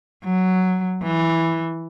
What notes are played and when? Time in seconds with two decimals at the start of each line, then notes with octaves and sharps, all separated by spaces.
0.24 F#3
1.03 E3